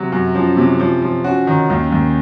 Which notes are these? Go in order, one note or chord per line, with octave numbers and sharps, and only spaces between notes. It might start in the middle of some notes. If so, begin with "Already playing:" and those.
Already playing: C3 F#3
F#2
F3 C#4
C3
F3 C#4
F3
C#4 F#4
D#3
D#2 C#4
D#2